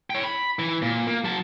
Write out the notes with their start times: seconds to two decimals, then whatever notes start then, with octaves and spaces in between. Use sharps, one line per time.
0.10 C#5 G5
0.24 B5
0.59 E3
0.82 A#2
1.07 A#3
1.24 F#3 A5